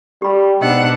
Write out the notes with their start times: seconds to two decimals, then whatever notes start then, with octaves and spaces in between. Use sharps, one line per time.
0.22 G3 G4 B5
0.62 G#2 B2 D4 D#5 F#5 E6